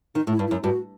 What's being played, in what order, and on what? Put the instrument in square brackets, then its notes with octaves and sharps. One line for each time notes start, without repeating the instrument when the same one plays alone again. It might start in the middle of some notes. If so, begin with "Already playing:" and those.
[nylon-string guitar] D#3 [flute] D#4
[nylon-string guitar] A2
[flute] E4
[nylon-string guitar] G2
[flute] E4
[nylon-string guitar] F#2
[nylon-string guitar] G2 [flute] F#4